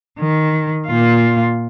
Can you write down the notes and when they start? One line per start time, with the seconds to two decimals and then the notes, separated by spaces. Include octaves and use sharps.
0.19 D#3
0.87 A#2 F4